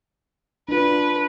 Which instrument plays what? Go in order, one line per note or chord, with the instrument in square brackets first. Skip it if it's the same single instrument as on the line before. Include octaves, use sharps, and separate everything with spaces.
[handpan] D4 F4 [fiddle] B4